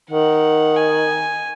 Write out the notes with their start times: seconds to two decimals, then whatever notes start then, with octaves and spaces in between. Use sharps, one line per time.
0.11 D#3 F#5
0.76 G#5